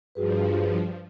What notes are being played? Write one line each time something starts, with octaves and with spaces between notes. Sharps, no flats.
G2 F3 F#4 G#4 B4